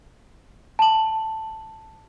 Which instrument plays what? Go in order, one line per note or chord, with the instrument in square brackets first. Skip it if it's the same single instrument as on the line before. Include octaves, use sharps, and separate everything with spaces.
[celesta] A5 F#7